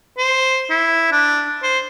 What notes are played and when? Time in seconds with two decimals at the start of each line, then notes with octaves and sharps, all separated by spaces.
0.18 C5
0.70 E4
1.12 D4
1.63 C5